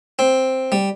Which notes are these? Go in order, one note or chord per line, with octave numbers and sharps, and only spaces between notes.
C4
G3